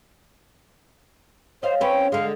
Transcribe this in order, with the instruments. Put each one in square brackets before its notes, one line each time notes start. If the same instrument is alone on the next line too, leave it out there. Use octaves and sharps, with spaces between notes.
[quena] C5 [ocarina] C#5 [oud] D#5 F5
[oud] C4 C#4 B4 [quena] G5
[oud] D3 G#3 [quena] F5